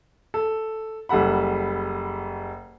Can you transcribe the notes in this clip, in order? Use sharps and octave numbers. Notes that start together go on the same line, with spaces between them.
A4
F#1 G3 A4 F#5 B5